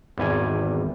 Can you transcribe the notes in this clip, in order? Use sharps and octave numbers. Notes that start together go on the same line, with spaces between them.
G#1 E2 G3 G#5